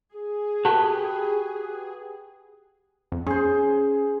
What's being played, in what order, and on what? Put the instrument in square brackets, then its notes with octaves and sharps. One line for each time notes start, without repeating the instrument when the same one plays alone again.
[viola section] G#4
[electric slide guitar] F#4 G4 B4 [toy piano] A4 A5
[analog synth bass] F2
[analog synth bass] C#4 [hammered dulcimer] G#4 C5